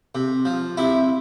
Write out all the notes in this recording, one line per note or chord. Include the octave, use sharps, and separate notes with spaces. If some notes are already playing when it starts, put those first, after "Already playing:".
C3
F3
C3 E4